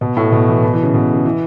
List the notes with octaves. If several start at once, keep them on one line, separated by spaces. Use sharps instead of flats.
B2
A2
B2
E3
B2
E3
C#3
B2
C#3
E3